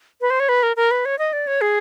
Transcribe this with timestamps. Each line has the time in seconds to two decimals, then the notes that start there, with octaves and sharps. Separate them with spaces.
0.21 B4
0.30 C5
0.40 C#5
0.49 B4
0.63 A#4
0.77 A#4
0.91 B4
1.05 C#5
1.19 D#5
1.33 D5
1.47 C#5
1.61 G#4